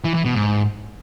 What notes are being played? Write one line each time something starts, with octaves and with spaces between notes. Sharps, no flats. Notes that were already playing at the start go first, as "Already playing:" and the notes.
E3
E3
B2
G#2